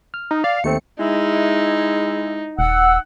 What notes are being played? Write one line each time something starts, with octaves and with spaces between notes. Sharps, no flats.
F6
D#4
D5 F5
D#2 A3 C4 C#7
G#3 D#4 E4
D#1 F#5 E6